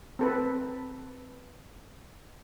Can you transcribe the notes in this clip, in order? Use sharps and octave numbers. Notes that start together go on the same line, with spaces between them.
C4 A4 B4